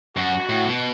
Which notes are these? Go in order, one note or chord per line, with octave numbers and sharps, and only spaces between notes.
F#2 F#4
A2
B2